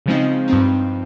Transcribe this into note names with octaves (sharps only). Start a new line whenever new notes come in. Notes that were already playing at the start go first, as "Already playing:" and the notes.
C#3 F3 G#3 C4 D#4
G2 F3 C4 D#4